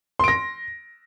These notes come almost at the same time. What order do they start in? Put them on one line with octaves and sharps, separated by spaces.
C6 D7 A#6